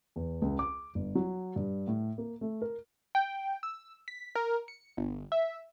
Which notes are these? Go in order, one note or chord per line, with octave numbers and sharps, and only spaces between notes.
E2
C#2
D6
G1
F#3
G2
A2
A#3
A3
A#4
G5
E6
B6
A#4
C#7
G1
E5